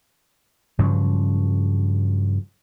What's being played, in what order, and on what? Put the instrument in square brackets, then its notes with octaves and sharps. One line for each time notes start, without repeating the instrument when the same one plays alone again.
[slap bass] G2 C#3 F3 F#3